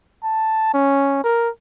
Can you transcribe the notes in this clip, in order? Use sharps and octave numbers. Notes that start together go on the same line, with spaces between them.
A5
C#4
A#4